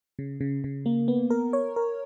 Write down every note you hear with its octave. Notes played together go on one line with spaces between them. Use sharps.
C#3
C#3
C#3
A#3
B3
A#4
C#5
A#4